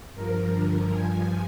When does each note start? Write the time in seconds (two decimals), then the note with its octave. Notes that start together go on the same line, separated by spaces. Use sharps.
0.13 G2 F3 A#4
0.52 G2 D3 F3 A#4
0.91 G2 F3 G#5